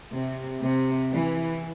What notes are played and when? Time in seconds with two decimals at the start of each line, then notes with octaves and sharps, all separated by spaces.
0.13 C3
0.62 C3
1.11 E3